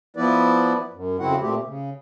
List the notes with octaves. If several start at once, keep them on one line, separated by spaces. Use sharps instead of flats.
F3 B3 E4 B4 D5
F#2
F2 C#3 C4 E4 F#4 F#5
A#2 A3 C4 G4
C#3